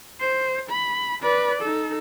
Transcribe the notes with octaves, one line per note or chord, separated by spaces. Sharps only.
C5
B5
B4 D5
D#4 A4